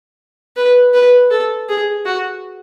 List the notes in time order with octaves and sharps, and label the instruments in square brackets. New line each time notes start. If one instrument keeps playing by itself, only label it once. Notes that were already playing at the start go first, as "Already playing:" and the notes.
[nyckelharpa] B4
B4
A4
G#4
F#4